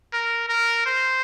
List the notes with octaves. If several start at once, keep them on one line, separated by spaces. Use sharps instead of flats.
A#4
A#4
C5